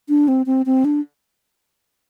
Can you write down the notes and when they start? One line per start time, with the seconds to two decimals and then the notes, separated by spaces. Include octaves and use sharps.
0.09 D4
0.28 C4
0.46 C4
0.66 C4
0.85 D4